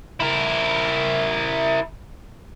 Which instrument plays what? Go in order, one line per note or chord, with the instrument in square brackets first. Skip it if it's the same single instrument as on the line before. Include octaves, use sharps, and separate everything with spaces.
[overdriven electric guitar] E4 A#4